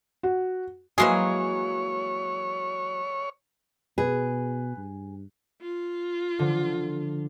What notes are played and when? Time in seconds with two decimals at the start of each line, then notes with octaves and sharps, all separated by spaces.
0.23 F#4
0.98 E3 F#3 G#3 A#3 G#4 C#5
3.98 B2 G#4 B4
4.77 G2
5.61 F4
6.39 D3 F3